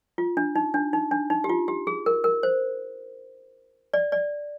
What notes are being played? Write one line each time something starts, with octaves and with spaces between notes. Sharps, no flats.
F4
D4
D#4
D4
D#4
D4
D#4
G4
F4
G4
G#4
A#4
A#4
C5
D5
D5